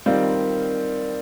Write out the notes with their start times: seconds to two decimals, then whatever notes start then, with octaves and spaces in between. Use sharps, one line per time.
0.06 D#3 G3 C4 F4